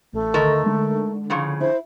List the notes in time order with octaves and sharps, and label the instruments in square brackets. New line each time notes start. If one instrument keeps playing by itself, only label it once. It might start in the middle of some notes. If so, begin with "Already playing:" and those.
[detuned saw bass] A1 [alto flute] A3
[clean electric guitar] D2 D#5 C6 [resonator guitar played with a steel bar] D#3 A4 A#4
[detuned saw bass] D3 [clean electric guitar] G#3
[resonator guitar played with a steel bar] A2 C#3 F3
[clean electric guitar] E4 [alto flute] C5